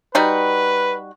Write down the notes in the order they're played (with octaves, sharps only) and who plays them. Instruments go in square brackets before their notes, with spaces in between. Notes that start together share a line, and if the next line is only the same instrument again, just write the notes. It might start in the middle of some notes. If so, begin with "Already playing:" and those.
[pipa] G3 D#4 F#4 [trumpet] B4